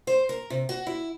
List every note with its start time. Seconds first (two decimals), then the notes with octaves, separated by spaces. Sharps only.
0.07 C5
0.29 A#4
0.50 C3
0.69 F#4
0.87 E4